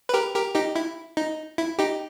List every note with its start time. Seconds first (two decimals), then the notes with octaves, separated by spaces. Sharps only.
0.09 B4
0.14 G4 A#4
0.35 G4 A#4
0.55 D#4 G4
0.76 E4
1.17 D#4
1.58 E4
1.79 D#4 G4